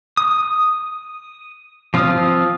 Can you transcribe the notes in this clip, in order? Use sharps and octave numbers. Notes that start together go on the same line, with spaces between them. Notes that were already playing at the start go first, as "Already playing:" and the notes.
D#6
F3 C4 F4 F5 D#6